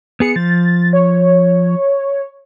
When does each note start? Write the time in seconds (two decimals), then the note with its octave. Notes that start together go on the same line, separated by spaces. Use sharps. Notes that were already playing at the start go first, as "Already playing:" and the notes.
0.20 B3 G#4 C#7
0.36 F3 A6
0.93 C#5